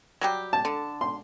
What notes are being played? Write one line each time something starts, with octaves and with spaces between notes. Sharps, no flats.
F#3 G3 G4
A5
D3
C6